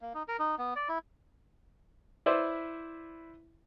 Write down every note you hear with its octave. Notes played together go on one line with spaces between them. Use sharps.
A#3
D#4
A#4
D#4
B3
D5
E4
E4 B4 C5 D5 E5